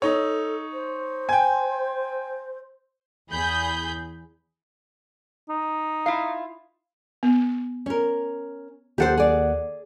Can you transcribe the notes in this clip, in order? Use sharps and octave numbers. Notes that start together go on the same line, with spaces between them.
D#4 A4 C#5
C5
G5 G#5
E2 G#4 B5 G6
D#4
E4 F4 F5
B3
C#4 A#4
D#2 G4 A4 C5 F#5
G#4 D5